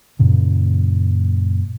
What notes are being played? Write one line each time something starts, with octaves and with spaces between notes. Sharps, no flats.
F#2 A#2 C#3